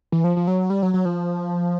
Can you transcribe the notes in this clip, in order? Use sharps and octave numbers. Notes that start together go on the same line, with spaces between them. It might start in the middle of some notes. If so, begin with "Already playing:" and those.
E3
F3
F3
F#3
G3
F#3
F#3
F3